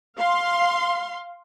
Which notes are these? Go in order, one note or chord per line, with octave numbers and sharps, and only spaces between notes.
F5 C6